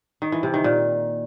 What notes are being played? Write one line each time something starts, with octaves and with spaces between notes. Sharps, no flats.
D#3
E3
C3
D#3
A#2